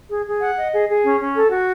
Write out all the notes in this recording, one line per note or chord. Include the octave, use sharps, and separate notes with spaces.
G#4
G#4
F#5
D#5
G#4
G#4
C#4
C#4
A4
F#4